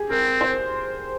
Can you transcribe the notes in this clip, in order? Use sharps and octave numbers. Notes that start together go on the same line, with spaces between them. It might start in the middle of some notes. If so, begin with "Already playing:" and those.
Already playing: G4 G#4
C4 A#4
C5